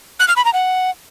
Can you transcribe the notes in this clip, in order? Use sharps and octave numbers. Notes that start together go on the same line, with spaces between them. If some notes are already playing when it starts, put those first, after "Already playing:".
F#6
F6
B5
A#5
F#5